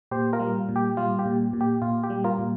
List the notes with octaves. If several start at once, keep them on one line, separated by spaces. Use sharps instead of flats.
A#2 G4 C5
F4 A#4
G3
A#2
G4
G3 F4
G4
A#2
A#2
G4
A#2 F4
G4
G3
F4 A#4
A#2